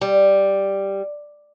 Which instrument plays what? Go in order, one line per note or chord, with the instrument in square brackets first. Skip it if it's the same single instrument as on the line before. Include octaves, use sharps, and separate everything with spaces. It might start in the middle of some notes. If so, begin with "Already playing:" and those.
[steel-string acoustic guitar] G3